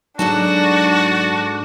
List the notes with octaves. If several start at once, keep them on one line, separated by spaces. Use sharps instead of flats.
G#2 F#3 D4 D#4 F#4 A4 D5 A5